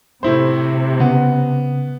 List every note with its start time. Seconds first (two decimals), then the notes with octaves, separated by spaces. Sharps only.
0.23 A2 C3 E4 C5
1.00 C#3 B3